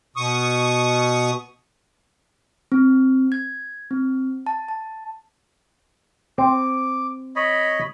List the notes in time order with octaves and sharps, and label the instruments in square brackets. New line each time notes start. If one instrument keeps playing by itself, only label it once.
[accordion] B2 C#6 D#6
[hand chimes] C4
G#6
C4
A5
A5
[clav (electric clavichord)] C4 [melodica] D6
[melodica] C#5 D#5 B5